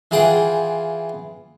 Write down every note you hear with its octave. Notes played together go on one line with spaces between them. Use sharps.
E3 F4 G#4 F#5 G5